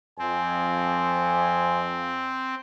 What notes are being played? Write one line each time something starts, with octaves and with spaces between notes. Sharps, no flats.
F2 F3 C4 G#5